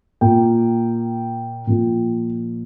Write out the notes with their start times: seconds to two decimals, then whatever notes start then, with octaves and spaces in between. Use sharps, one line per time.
0.21 A#2 A#3 G5
1.67 A#2 F3 A#3